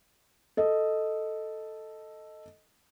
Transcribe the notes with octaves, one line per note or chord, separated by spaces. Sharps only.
A4 D#5